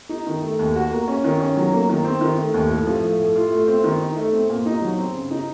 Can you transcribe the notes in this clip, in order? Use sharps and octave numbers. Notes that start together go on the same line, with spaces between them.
D#4
D#3
A3
D#2
F#4
A#3
C#4
D#3
C#4
F#3
A#3
D#3
C4
D#3
A3
D#2
A2
F3
A3
A2
F4
A3
C4
D#3
D#4
A3
C4
A#2
D#4
F#3
C4
C#3
D#4